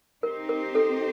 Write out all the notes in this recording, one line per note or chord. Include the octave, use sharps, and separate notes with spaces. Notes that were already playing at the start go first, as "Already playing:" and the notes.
C4 D#4 G4 A#4 C5
A#4
A4